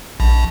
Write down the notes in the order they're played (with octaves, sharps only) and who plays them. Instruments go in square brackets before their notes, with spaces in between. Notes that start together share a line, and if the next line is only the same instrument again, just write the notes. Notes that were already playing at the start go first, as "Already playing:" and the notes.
[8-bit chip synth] A#1